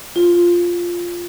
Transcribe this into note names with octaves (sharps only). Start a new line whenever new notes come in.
F4